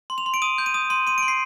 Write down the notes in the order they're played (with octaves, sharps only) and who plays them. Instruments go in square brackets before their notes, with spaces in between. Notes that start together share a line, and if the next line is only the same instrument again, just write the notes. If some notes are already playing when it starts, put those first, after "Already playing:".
[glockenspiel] C6
F7
C6
D7
D#6 D#7
G6
D#7
D#6
C6 D#7
C6 D#7
C6 D7
C7